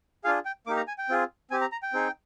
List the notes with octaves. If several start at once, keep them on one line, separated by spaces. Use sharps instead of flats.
D4 F4 G#4 F5
G5
A#3 D#4 G4 D6
A#5
G#5
G5
C4 F4 G#4
C4 G4 G#5
A#5
A#5
G5
C4 D#4 G#4